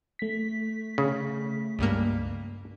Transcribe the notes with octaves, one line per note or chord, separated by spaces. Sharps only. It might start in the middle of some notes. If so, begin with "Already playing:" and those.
A3 B6
C#3
C#2 G2 A#3